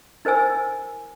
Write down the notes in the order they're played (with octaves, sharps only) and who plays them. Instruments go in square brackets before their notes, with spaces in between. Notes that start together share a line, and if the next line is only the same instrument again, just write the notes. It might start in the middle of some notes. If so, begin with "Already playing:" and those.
[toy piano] E4 A#4 C5 G#5 E6